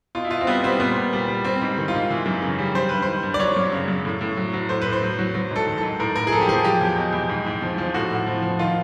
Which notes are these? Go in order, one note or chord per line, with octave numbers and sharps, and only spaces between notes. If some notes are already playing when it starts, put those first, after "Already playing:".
B2 F4
E4
B2 F4
C4
G3 B3
G3 C4
A#2 B3
A#2
G3
G3
G3 C4
G#2
D#3
F4
G#2
E3
F#2
C#3
G3
G3 C5
G2 B4
C5
D#3
G2
D5
F#3 C#5
F#2
C#3
F#2
A2
A2
F#3
F#3
A2 C5
A2 B4
C5
F#3
F#3
F#3
G#2 A4
D#3
A4
G#2
A2 A#4
A2 A#4
G#4
F3 A4
G4
F3 G#4
F#3 G4
E2
B2
E2
G#2
G#2
F3
F3
A2 F#4
A2
F3
F3
D#3 F4